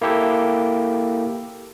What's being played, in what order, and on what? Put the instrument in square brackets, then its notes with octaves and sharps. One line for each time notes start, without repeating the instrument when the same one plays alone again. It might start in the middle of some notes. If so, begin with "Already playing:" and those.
[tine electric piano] A#3 E4 G4 A4